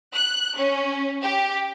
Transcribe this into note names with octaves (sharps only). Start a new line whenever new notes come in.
F#6
C#4
G4